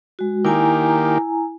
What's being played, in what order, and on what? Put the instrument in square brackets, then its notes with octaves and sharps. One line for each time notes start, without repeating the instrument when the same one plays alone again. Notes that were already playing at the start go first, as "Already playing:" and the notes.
[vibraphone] G#3 F#4
[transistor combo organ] D#3 A#3 G4 [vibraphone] E4 G#5 A#5